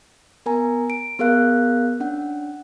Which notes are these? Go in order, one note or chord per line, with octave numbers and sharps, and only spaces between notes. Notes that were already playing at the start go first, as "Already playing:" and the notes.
B3 A#4 G#5 A#5
D7
B3 G#4 A#4 F5 F#6
C#4 D4 F#5